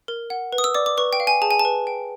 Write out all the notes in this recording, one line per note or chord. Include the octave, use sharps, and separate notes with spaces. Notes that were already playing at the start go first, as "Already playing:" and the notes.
A#4
F#5
B4
D#6
E6
D5 D6
D6
B4 C#6
G5
F5
G#5
G#4 A5
G#5
A5
B4
G5